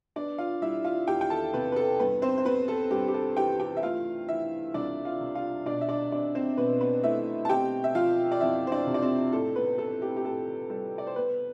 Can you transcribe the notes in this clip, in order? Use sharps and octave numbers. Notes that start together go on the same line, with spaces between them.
B3 D4 D5
F4 F5
G3 E4 E5
F4 F5
E2 G4 G5
G5
A4 A5
C3 B3 B4
B4
A4
G2 B3 B4
C4 C5
C5
B3 B4
A4
G2 G4
G4
A4
E3 G4 G5
G4 G5
E5
A3 F4 F5
E3 E4 E5
C2 D4 D5
F4 F5
C3
F4 F5
B2 D4 D5
E5
D4 D5
C4 D4 D5
C4 C5
B2 B3 B4
B3 B4
A3 E4 E5
A5
C4 G4 G5
E5
F3 F4 F5
D5
F2 E4 E5
C5
D4 D5
C3
D5
C4 C5
A2 A4
B3 B4
B3 A4
G4
G4
A2 A4
G3 A4
D5
C5
B3 B4